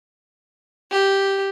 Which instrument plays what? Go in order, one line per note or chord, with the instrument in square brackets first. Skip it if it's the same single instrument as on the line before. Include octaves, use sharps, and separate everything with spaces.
[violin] G4